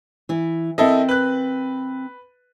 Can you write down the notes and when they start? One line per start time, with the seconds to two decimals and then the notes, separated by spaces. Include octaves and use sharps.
0.29 E3 E4
0.78 C4 E4 A4 A#4 D#5 F5
1.09 B4 F#6